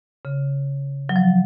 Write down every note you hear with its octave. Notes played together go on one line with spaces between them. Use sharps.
C#3
F#3
F3